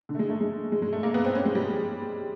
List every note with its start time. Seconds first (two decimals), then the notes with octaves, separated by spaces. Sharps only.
0.09 D3
0.15 A3
0.19 G#3
0.30 A3
0.41 G#3
0.72 G#3
0.82 G#3
0.93 A3
1.03 A#3
1.14 B3
1.25 C4
1.35 C#4
1.45 G#3
1.55 G3